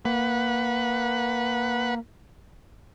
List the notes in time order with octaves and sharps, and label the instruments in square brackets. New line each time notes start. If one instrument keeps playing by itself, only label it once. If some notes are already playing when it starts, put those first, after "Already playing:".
[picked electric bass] A#3 [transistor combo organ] B4 F#5